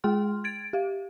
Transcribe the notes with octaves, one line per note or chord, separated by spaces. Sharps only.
G#3 G#4 G5 C6 F6
G#6 A6 D7
G4 F5